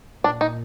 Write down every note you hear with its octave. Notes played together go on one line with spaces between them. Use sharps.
A#2 D4
D#4